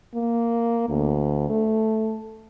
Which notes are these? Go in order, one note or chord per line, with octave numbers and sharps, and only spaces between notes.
A#3
D2
A3